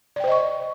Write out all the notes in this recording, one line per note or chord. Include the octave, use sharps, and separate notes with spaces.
C5 D5 D#5 G5 C#6